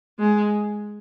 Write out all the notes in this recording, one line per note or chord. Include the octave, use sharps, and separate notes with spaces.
G#3